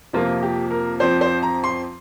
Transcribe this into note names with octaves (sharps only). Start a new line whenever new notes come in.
F2 C3 F3 A#3 F4
G4
A#4
F2 F3 C4 C5
C5
A#5
C6